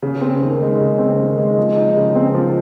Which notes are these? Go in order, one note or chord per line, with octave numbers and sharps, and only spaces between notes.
C#3
C4
D#2
G#3
C#3
C4
D#2
G#3
F3
D#4
C#3
C4
F3